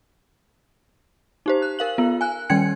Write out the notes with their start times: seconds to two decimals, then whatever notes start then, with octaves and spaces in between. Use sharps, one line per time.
1.46 D#4 G4 C5
1.62 F#6
1.79 A#4 F5 F#7
1.98 B3 F4
2.21 G#5 F#6
2.50 D#3 G3 C#4 G5 G#6 C#7